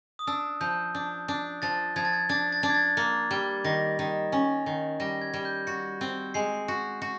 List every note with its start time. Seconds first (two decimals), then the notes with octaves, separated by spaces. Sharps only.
0.19 D#6
0.27 D4 E6
0.61 F3 G6
0.95 D4
1.28 D4
1.62 F3 A6
1.96 F3 G#6
2.05 A6
2.13 G#6
2.29 D4 A6
2.52 A6
2.63 D4
2.70 G#6
2.75 A6
2.97 A#3
3.31 G3
3.64 D#3 A#6
3.99 D#3
4.32 C#4
4.66 D#3
5.00 G3 A#6
5.21 G#6
5.34 G3
5.45 G6
5.67 F#4 C#7
6.01 C4
6.34 G#3 C7
6.68 F#4
7.02 F#4